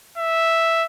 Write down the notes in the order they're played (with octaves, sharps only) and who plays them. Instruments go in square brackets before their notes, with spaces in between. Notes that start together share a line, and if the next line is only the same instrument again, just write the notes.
[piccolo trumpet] E5